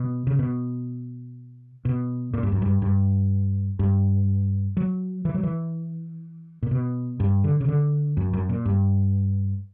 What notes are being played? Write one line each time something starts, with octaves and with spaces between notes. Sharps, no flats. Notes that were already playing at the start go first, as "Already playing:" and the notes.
Already playing: B2
C#3
B2
B2
A#2
G2
F#2
G2
G2
G2
F#3
E3
F#3
E3
A#2
B2
G2
D3
C#3
D3
F#2
F#2
A#2
G2